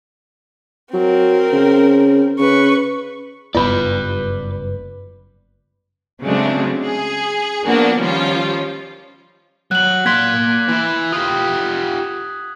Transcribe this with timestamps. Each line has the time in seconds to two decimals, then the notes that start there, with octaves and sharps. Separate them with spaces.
0.94 F#3 C4 A#4
1.53 C#3
2.39 C#3 B4 C#6
3.55 F#1 G2 B3 F4 B4 D5 B5
6.23 C#3 F#3 G#3 A3 C4 D4
6.84 G#4
7.65 F3 A#3 B3 D4 F#4
7.99 D#3 F3 G3 C#4 F4
9.71 F#3 F#6 F#7
10.06 A#3 C6 F#6 G#6 B6
10.68 E3 E4
11.12 F4 G4 D#6